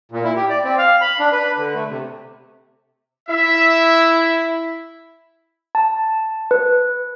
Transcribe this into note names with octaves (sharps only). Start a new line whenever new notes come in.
A#2
E4
G4
D5
C4
F5
B5
D4
B4
D3
A3
C3
E4 E5
A5
B4